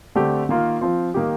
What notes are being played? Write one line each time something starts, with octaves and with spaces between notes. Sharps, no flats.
D3 A3 C4 G4
D#3 A#3 F4
F3 C4 F4
D#3 A#3 D#4 G4